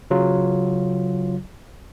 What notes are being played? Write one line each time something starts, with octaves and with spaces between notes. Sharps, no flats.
C#3 F#3 F4